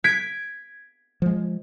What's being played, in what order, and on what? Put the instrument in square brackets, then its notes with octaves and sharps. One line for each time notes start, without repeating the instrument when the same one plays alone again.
[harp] G#6 B6 D7
[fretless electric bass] F3 G#3